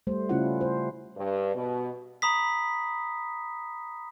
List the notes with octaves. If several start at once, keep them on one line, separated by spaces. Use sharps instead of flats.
G3 A3 C5
C#3 A3 C#4 E4 F4 F#5
C5
G2
B2
A#5 B5 D#6 B6